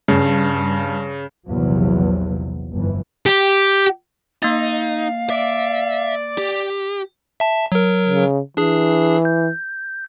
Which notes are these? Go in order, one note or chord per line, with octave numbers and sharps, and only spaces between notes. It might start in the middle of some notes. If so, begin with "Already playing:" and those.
G2 C#3
A#1 E2 C3 F3 F#3
G1 F2 E3
G4
A#3 D#4 F5 A6
D5 E5
G4
E5 A5
F#3 A#4
C#3
E3 D4 G#4
G6